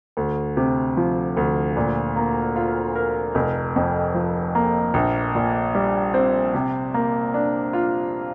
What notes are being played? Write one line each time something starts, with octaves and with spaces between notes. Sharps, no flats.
D2
C3
F3
D2
A#2
A#3
F4
A#4
F1
F2
F3
A#3
A#1
A#2
G3
C4
C3
A#3
D4
F4